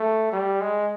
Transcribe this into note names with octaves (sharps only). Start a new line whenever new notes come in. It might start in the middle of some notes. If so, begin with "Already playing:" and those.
Already playing: A3
G3
G#3